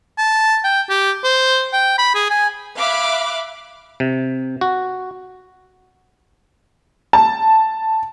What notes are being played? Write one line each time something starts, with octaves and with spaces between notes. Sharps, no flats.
A5
G5
G4
C5
G5
B5
G#4
G#5
E5 F5 B5 D6 F#6
C3
F#4
A5